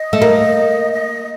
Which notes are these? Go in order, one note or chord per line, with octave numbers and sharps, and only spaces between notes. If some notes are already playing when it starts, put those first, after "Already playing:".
Already playing: D#5
A3
A#3
D#5